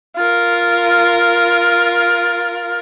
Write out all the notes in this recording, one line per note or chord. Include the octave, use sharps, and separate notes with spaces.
F4 A#4